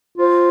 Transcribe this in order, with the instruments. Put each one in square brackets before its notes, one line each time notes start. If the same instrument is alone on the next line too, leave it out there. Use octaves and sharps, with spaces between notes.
[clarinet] F4 [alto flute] C5